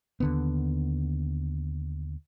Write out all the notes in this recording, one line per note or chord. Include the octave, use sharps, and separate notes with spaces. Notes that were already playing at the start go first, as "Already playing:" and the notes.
D#2 D3 B3